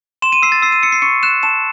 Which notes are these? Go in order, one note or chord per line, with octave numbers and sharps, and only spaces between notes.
C6 E7
D#7
E6 C7
A6
E6 C7
D#7
E6 C#7
C7
C#6 C#7
F#6 E7
A5 E7